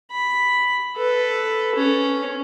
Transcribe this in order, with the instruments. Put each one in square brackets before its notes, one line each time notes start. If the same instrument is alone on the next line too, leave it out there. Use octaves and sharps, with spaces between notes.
[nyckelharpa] B5
A4 B4
C#4